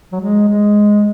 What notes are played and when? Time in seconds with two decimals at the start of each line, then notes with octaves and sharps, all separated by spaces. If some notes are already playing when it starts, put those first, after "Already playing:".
0.12 F#3
0.21 G#3
0.48 G#3